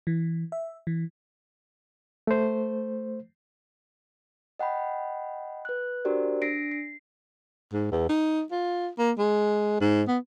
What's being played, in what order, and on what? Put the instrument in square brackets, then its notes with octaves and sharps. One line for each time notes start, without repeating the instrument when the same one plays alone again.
[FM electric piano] E3
E5
E3
[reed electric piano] A3 C5
[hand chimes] D#5 F#5 G5 B5
B4 F#6
D4 F#4 G4 A#4 C5 D5
D4 A#6 C7 D7
C7
[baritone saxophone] G#2
E2
D#4
F4
A#3
G#3
G#2
B3